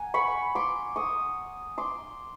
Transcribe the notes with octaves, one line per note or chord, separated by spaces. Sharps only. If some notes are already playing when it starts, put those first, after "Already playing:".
Already playing: A#3 F#5 G#5
B5 C#6
C6 D6
C#6 D#6
C6 D6